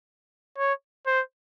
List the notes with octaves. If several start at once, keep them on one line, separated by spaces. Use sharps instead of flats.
C#5
C5